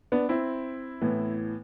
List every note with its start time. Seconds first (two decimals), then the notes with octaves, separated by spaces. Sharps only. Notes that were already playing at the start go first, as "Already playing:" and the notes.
0.12 B3 D4
0.29 C4 E4
1.01 A2 E3 B3